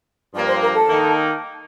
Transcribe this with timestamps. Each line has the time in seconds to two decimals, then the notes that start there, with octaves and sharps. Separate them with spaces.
0.33 G2 F3 A#3 D5
0.47 C5
0.61 A#4
0.74 A4
0.88 D#3 A#3 D#4